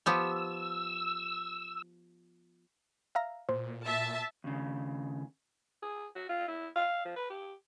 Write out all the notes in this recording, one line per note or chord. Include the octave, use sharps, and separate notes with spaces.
F3 B3 G4 E6
E5 F5 A#5
A#2 C5
E5 A5
D#2 C#3
G#4
F#4
F4
E4
F5
F3
B4
G4